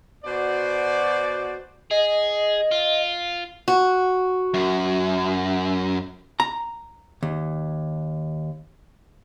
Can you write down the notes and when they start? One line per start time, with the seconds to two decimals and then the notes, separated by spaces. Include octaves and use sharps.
0.25 B2 F#4 C5 D5
1.91 G#4 D#5
2.71 F4
3.68 F#4
4.54 F#2
6.40 A#5
7.23 D#2